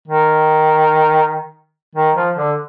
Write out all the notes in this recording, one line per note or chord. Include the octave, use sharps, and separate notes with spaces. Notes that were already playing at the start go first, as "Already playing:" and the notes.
D#3
D#3
F3
D3